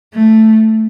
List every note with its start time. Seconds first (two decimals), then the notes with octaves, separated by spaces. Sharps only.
0.14 A3